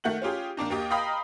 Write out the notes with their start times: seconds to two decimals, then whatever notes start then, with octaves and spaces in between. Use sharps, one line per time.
0.04 D#3 A3 F#5 G6 F#7
0.22 C#4 F4 G4 G#4
0.57 D#3 A#3 D4 D#4
0.70 D#2 A#3 G4 D#5
0.90 D#5 F5 G5 A#5 B5 D#6